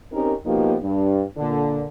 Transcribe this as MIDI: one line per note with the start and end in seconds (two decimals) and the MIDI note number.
0.12 0.33 60
0.12 0.33 61
0.12 0.33 63
0.12 0.33 67
0.12 0.33 70
0.45 0.75 47
0.45 0.75 53
0.45 0.75 58
0.45 0.75 59
0.45 0.75 63
0.45 0.75 67
0.82 1.22 43
1.37 1.85 46
1.37 1.85 50